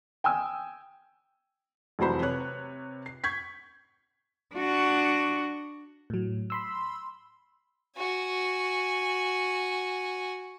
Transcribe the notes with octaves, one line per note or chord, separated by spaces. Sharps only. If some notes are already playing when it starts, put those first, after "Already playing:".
G5 G#5 D#6 E6
F1 E3 F#3 C5 B5
C3 B4 C#5 F#6
C7
C#6 G6 G#6 B6
D4 F#4
A2 F#3
B5 C6 E6
F#4 G#5